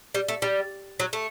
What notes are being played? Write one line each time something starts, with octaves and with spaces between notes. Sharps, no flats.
G3
A3
G3
F#3
A3